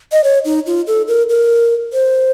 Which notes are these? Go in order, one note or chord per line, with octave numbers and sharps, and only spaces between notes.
D#5
C#5
D#4
F4
A4
A#4
A#4
C5